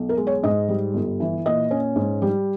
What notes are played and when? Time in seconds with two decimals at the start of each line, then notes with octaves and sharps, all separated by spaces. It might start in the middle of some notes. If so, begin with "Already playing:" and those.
Already playing: B1
0.09 A#4
0.17 G#3
0.27 C#5
0.43 G#2 D#5
0.69 G3
0.94 G1
1.20 E3
1.46 A#2 D#5
1.71 C#4
1.96 G#2
2.22 G3